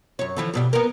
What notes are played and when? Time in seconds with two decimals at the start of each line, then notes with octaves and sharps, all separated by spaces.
0.19 F#2 C#5
0.37 D3 E3 F3
0.54 G2 B2 G3
0.73 B3 A#4